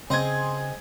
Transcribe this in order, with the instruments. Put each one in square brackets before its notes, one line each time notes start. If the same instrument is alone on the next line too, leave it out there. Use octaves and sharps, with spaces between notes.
[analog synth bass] C#3 [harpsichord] C4 D#5 [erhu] G#4 [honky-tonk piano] C6 G#6